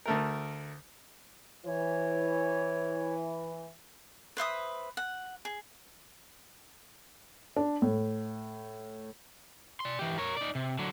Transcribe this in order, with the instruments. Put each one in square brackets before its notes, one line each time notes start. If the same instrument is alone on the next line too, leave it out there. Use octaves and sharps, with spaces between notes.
[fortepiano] D2 A3 A#4
[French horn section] E3 [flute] C#5
[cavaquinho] B4 C5 E5 D#6
F#5
G#4
[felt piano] D4
A2
[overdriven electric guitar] D5 C6
E3 G4
A#4 C#5
D#4 D5
C3
D3 F#3